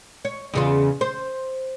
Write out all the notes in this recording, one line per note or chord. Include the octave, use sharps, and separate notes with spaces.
C#5
E2 C#3 F4
C5